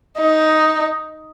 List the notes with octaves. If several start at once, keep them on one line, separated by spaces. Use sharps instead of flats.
D#4